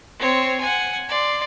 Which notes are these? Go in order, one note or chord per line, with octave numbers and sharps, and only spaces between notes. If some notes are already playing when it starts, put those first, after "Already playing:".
C4 C#5
F#5 G#5
D5 C6